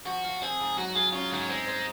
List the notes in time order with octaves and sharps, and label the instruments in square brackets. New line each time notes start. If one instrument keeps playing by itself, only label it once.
[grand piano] F3 [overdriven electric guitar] F#4
[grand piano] F4
[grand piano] C4 [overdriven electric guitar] G#4
[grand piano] G#2
[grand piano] F#3 [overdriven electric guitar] F#4
[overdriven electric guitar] F4 [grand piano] G#4
[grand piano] C#4 [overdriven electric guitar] F4
[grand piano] G#2 [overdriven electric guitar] F#3
[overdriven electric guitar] G#3 [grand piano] C4
[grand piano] C5